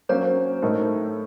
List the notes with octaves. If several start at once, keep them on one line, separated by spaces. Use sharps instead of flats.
F#3 A#3 C#4 C5
A2 A3 D#4 A#4